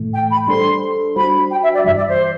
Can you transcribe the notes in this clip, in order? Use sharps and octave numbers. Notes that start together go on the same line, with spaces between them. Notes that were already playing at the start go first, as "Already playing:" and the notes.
Already playing: A2 E3 A3
G5
B5
G3 D4 A4 C5 C6
G3 D4 F#4 C5 B5
G5
E5
D5
G2 E3 G3 E5
D5
C5